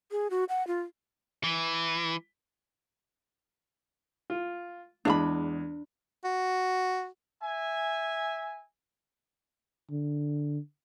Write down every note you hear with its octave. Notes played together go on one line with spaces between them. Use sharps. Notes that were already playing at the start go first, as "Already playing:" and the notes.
G#4
F#4
F#5
F4
E3
F4
E2 G#3 D4 E5 B5
F#4
E5 G#5
D3